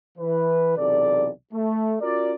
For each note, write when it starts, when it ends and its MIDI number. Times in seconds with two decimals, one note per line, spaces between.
0.18 0.76 52
0.18 0.76 71
0.77 1.29 35
0.77 1.29 40
0.77 1.29 48
0.77 1.29 69
0.77 1.29 74
1.53 1.95 57
2.01 2.34 61
2.01 2.34 65
2.01 2.34 66
2.01 2.34 70
2.01 2.34 74